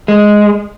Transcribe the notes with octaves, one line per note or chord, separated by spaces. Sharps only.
G#3